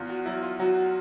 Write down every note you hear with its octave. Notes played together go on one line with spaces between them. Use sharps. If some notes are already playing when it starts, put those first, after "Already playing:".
Already playing: E2 F4
F#4
F#3 E4
F4
F#3 F#4